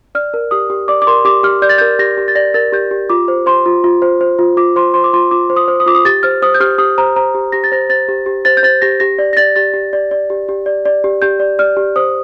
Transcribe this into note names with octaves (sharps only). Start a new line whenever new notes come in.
D5 F6
A#4
G4 D#6
G4
D5 D6
D6
A#4 C6
G4 D6
G4 F6
D5 G6
A6
A#4 G6
G4 A#6
G4
A6
D5 A#6
A#4 A6
G4 G6
G4
F4 D6
C5
C5 C6
F4
F4
C5
C5
F4
F4 D6
C5 C6
C5 C6
D6
F4 C6
F4 D6
C5
D#6
C5
D#6
F4 D6
D#6
G4 A6
C5 F6
C5 D#6
G6
G4 F6
G4 D#6
C5 A#5
C5 A#5
G4
G4 A#6
A6
C5 A#6
C5 A6
G4
G4
C5 A6
G6
C5 A6
G4 A#6
G4 A#6
D5
A#6
D5 A6
G4 A6
G4
D5
D5
G4
G4
D5
D5
G4
G4 G6
D5
D5 F6
G4
C5 D#6